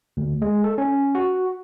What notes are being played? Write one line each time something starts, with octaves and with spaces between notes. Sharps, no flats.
D2
G#3
A4
C#4
F#4